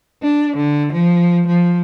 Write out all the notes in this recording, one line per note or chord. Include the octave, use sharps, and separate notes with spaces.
D4
D3
F3
F3